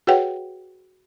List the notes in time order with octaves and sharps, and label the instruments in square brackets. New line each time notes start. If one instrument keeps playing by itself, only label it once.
[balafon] F#4 G#4 B4 C#5 F#5 G5